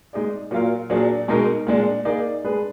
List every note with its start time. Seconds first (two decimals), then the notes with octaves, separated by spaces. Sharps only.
0.13 G#3 D#4 G#4 D5
0.51 A#2 F#3 A#3 F4 A#4
0.90 A#2 F#3 D4 G#4
1.28 B2 G#3 D#4 A#4
1.67 A#2 G#3 D4
2.05 A#3 D#4 G#4 D5
2.44 G#3 D4 G#4 B4